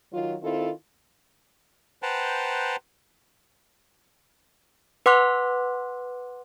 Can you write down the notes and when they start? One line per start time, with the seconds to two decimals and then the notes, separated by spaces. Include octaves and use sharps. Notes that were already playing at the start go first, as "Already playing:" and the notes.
0.12 D#3 F#3 F4
0.42 D#3 C4 E4 F4 A4
2.03 B4 C5 F#5 G5 A5 A#5
5.06 B4 F#5 C6 D6 F#6